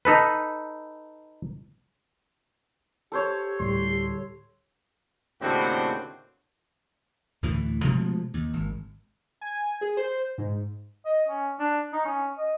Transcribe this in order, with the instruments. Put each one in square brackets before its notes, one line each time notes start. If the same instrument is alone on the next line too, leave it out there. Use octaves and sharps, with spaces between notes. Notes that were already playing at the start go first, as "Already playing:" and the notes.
[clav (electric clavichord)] D#4 A4 B4
[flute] G4 [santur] A4 C5 C#5
[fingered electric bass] D2 A2 G3 [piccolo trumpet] C6
[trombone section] D#2 A2 C#3 C4 D4 F#4
[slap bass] D2 A2 D3 E3
B2 F3 G#3 A3
D#2
G#1
[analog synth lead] G#5
G#4
C5
G#2
[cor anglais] D#5
C#4
D4
D#4
C#4
D#5